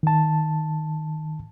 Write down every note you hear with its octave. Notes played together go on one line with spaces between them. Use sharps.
D#3 A5